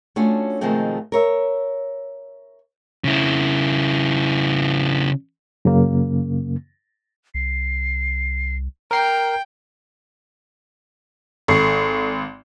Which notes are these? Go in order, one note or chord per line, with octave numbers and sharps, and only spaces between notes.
A3 C#4 D4 F4 F#4
B2 D#3 F3 G#3 A3 C4
A#4 C#5 E5
C#3 E4
F#2 C#3 A#3
C2 C7
A#4 G5 A#5 C7
G#1 A4 C#6 C7